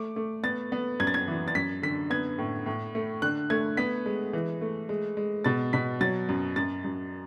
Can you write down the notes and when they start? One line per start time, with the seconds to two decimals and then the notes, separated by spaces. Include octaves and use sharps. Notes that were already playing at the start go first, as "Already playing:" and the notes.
Already playing: A3 D6
0.16 A3
0.43 B3 A6
0.72 B3
1.00 F#2 G#6
1.07 A6
1.14 G#6
1.28 E3
1.48 A6
1.55 F#2 B6
1.83 D3 B6
2.10 B3 G#6
2.38 A2
2.66 A2
2.95 A3
3.22 D3 F#6
3.50 A3 G#6
3.77 B3 B6
4.06 G#3
4.33 E3
4.61 A3
4.89 G#3
5.17 G#3
5.44 B2 A6
5.73 B2 B6
6.01 F#3 A6
6.29 F#2
6.56 F#2 A6
6.84 F#2